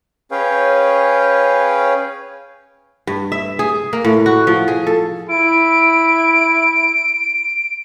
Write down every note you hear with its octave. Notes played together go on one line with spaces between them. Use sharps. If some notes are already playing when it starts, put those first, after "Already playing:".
C#4 G#4 B4 C#5 F5 G5
G2
E5
G#4
A#3
A2
F#4
F3
G#4
A4
E4 D7